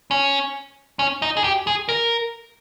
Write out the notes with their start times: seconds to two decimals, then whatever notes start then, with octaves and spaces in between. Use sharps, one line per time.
0.11 C#4
0.99 C#4
1.22 D#4
1.37 G#4
1.44 G4
1.67 G#4
1.89 A#4